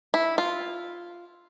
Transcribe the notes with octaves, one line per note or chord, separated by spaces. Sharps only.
E4
F4